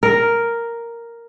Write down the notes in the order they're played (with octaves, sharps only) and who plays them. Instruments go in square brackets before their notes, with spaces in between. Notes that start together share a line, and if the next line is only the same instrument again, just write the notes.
[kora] A#4